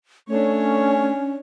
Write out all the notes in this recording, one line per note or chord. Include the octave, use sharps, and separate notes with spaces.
A3 C#4 D4 C#5